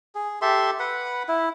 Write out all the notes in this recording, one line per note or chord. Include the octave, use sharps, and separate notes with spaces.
G#4
G4 A4 E5 C6
B4 F#5 B5
E4